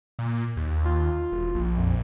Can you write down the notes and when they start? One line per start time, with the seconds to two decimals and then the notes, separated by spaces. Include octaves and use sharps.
0.19 A#2
0.57 D#2
0.85 F4
1.32 E1
1.55 A#1
1.77 F2